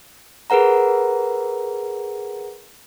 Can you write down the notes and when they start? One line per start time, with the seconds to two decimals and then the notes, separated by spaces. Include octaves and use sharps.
0.50 G#4 A#4 B4 F#5 A#5